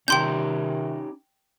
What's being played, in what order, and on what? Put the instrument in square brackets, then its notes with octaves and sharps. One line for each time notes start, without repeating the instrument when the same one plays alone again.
[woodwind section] C3 D#3 [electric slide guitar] C#4 D#4 G4 [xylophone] G5 C6 G6